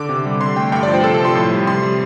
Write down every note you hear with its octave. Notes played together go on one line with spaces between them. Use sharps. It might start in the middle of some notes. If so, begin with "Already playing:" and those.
Already playing: D3 D6
C3
G3
D3 C6
A3 G5
G2 G5
F3 D5
C5
C3 A4
A4
F3 C6
A2
G3
C3 C6
G3